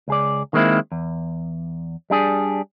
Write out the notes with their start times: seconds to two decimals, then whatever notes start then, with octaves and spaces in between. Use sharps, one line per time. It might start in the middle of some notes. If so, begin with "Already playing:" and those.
0.08 C#2 G#4 D5
0.53 D#3 G#3 A#3 C4 E4
0.92 E2
2.10 G3 D4 G#4